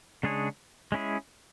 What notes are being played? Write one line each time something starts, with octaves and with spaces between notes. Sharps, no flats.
C#3 G#3 D4 G#4 C#5
G#3 C#4 E4 G#4